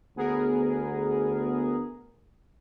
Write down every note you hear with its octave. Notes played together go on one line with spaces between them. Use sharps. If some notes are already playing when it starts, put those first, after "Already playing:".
D2 B3 G#4 A#4